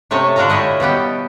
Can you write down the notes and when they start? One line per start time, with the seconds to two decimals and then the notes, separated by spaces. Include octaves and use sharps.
0.11 C3 A3 C#5 D#5 A5
0.36 D3 D4 F#4 A4 F5 A#5
0.49 E4 G4 C#5 D#5 F5
0.80 B2 G3 B3 G4